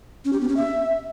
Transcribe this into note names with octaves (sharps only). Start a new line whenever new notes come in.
C#4
G4
B3
C#4
E5